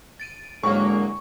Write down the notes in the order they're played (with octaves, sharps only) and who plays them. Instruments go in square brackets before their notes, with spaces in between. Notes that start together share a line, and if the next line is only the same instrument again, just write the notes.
[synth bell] A6 D7 D#7
[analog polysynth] G#2 F#3 A#3 [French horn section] D3 E4 G#4 [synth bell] G#3 [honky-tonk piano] C#6